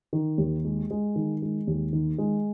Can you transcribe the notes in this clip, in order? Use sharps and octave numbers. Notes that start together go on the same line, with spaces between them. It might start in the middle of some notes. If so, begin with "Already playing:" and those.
D#3
D#2
G#3
G#3
D#3
G#3
D#2
D#3
G#3